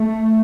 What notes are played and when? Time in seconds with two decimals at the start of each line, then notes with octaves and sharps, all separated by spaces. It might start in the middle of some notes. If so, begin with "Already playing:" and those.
Already playing: A3